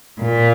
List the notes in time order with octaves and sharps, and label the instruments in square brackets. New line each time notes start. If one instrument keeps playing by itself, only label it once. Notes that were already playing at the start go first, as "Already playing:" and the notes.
[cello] A#2